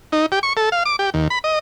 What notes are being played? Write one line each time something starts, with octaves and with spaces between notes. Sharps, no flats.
D#4
G4
C#6
A4
F5
D6
G4
D#2
B5
D#5